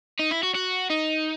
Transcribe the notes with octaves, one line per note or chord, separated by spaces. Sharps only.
D#4
E4
F#4
F#4
D#4